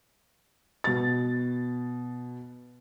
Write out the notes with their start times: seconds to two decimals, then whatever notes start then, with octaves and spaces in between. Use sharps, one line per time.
0.84 B2 A6